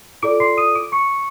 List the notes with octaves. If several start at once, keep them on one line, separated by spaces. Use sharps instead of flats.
F4 A4 D5 D6 D7
C6 C7
D#6 D#7
D6 D7
C#6 C#7